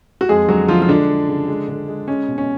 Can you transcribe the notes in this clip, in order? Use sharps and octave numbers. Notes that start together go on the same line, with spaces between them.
F#4
F2 G#3 G#4
D3 F#3 F#4
D3 F3 F4
F4
D3 G#3 D4
G#3
C#3
G#3
D3
G#3
G#3 C#4
B2
C#4